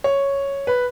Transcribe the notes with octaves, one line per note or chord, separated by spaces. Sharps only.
C#5
B4